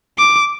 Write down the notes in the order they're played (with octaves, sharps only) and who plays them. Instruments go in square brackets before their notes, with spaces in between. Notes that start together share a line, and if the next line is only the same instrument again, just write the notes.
[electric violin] D6